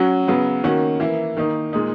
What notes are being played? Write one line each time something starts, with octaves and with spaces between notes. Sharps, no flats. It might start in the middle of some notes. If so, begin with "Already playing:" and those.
Already playing: F#3 C#4 F#4
C#3 F#3 B3
D#3 A#3 C#4 F#4
E3 A#3 E4
D#3 A#3 D#4
A#2 G#3 D#4